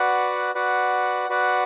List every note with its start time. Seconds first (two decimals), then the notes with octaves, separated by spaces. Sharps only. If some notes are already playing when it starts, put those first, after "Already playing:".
Already playing: F#4 B4 D5 F#5
0.55 F#4 B4 D5 F#5
1.29 F#4 B4 D5 F#5